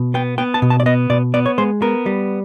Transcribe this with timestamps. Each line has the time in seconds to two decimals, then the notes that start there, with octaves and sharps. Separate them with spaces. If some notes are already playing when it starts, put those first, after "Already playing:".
Already playing: B2
0.14 B3 G5
0.38 B3 G5
0.54 A5
0.62 B2
0.70 A5
0.80 D5
0.86 B3 D#5
1.10 B2 D5
1.34 B3 D5
1.46 C#5
1.58 G#3 C5
1.82 B3 A#4
2.06 G3